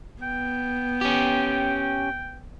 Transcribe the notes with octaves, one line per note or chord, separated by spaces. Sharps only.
B3 G5
C#4 G4